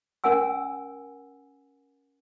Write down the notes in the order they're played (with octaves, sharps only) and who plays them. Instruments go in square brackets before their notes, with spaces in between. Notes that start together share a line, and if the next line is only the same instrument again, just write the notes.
[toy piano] C#4 A#4 F#5 G#5 E6